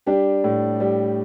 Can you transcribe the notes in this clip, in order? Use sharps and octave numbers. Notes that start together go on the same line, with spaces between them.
G3 D4 G4
A2
G3